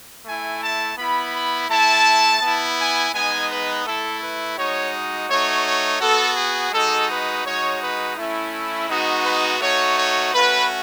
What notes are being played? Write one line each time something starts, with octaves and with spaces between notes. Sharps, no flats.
A3 E4 G#5
A5
B3 E4 B5
B5
A3 E4 A5
B3 E4
G#5
G#3 B3 D#4 G#5
B4
A3 E4 A4
B4
G#3 D#4 F#4 C#5
A3 D#4 F#4 C#5
C#5
B3 F#4 A4
G#4
G#3 D#4 F#4 A4
B4
G#3 D#4 F#4 C#5
B4
A3 C#4 E4
G#3 B3 D#4 F#4
B4
A3 D#4 F#4 C#5
C#5
A3 C#4 F#4 B4